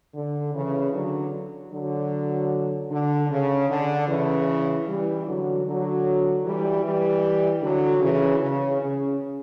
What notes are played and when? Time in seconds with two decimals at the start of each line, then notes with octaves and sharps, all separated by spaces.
0.15 D3
0.55 C#3 E3
0.93 D3 F#3
1.72 D3 F#3
2.90 D3
3.30 C#3
3.69 D3
4.07 C#3 E3
4.87 E3 G3
5.26 D3 F#3
5.65 D3 F#3
6.44 E3 G3
6.83 E3 G3
7.61 D3 F#3
8.02 C#3 E3
8.40 C#3
8.80 C#3